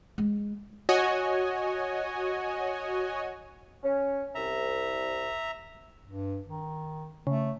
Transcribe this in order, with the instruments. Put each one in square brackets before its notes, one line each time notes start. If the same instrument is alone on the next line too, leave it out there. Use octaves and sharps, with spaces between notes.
[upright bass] G#3
[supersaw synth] F#4 C#5 D#5 G#5
[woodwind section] C#4
[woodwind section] C2 [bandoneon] E5 A#5
[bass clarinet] G2
D#3
[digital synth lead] C#3 [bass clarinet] A3